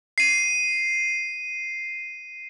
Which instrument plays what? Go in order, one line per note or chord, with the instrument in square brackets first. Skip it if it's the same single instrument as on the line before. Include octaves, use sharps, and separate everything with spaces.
[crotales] C7 D#7